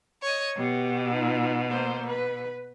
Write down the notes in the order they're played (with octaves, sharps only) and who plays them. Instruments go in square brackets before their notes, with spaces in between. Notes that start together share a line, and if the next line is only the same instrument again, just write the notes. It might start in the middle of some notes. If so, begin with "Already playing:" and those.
[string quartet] C#5 D#5
[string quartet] B2 [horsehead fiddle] B3 G4
[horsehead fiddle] D#4 F4
A#3 C5
B4